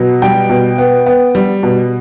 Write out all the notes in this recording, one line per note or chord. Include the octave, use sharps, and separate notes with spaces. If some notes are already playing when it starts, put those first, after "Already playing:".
Already playing: B2 F#3
G3 G5
B2
B3
B3
G3
B2